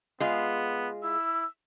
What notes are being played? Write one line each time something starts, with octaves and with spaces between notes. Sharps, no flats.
G#3 B3 F4
E4 E6